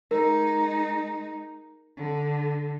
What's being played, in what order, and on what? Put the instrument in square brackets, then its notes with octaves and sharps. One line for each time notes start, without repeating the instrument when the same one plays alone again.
[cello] G#3 D#4 [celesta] A#4
[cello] D3